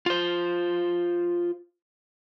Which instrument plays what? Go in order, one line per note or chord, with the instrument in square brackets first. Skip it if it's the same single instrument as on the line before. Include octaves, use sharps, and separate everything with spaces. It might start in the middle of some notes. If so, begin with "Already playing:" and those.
[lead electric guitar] F4 C5